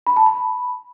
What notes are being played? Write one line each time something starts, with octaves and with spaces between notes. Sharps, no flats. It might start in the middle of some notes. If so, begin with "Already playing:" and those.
B5
A5
B5